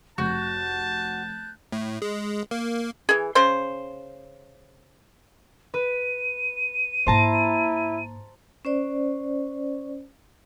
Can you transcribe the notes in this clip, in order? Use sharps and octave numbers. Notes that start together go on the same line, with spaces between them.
F1 F#4 A5 F#6 G6
A2
G#3
A#3
E3 G#4
C#3 C5 C6
B4 D#7
G#2 A#3 E4 C5 A5 A#5
C#4 C5 D5